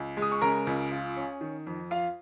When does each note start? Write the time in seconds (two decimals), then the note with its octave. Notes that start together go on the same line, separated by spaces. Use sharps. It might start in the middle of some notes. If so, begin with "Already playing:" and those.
Already playing: C#2
0.17 G#3
0.22 D#6
0.32 C#6
0.41 C#3 A#4 A#5
0.67 C#2
0.92 F4
1.16 C#4
1.41 D#3
1.67 F2
1.91 F4 F5